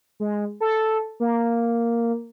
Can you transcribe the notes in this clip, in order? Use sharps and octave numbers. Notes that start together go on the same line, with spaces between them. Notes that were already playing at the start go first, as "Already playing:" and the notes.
G#3
A4
A#3